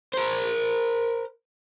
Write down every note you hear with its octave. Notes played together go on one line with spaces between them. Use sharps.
A#4 C5